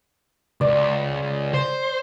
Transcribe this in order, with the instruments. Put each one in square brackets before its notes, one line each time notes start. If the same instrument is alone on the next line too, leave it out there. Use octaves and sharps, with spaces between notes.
[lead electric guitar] C#2 [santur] D5
[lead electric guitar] C5